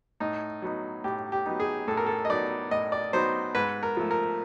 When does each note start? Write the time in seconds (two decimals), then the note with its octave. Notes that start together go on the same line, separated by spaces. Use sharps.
0.20 A2 D#4
0.62 F#3 B3 D#4
1.04 A2 G4
1.32 G4
1.46 F#3 B3 D#4
1.60 G#4
1.87 A2 A4
1.97 A#4
2.06 A4
2.25 D#5
2.30 F#3 B3 D#4 D5
2.71 A2 D#5
2.92 D5
3.13 F#3 B3 D#4 C5
3.55 G#2 B4
3.83 A#4
3.97 F3 A3
4.11 A#4